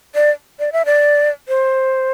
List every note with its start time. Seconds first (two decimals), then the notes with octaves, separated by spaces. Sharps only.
0.15 D5
0.59 D5
0.73 E5
0.86 D5
1.48 C5